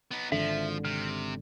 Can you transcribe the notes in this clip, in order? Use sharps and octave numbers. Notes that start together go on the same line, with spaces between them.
B3 D#4
G#1 D3 F3 E5
C3 F6